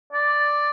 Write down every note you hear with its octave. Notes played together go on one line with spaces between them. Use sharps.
D5